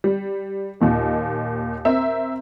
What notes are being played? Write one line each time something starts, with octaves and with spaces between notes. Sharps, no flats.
G3
D#2 A#2 D#3
C4 A#4 E5